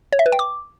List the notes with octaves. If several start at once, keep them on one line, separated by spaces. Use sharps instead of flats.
C#5
E5
B4
G5
D6